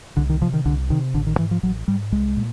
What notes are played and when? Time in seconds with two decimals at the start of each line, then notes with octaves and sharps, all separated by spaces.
0.17 C2 D3
0.30 D#3
0.41 C3 F3
0.53 D#3
0.65 C2 D3
0.90 C3 D#3
1.14 A1 D3
1.26 D#3
1.39 G#2 E3
1.51 F3
1.63 A1 F#3
1.88 G#2 G3
2.12 C2 G#3
2.36 A#2